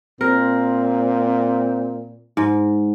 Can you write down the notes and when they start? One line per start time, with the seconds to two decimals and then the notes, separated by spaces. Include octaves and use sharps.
0.21 A#2 C4 A#4
2.37 G#2